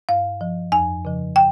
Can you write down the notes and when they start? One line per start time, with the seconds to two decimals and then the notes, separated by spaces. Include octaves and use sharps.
0.09 G2 F5
0.41 F3
0.72 F2 G#5
1.05 C#3 F3
1.36 G5